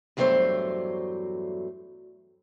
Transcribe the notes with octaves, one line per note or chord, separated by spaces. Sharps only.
E2 G2 F#3 A3 C5 D5